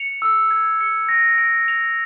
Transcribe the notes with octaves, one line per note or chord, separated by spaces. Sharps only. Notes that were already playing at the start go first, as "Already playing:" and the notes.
Already playing: C#7 F7
E6
G#6
C#7
A#6
D7
F7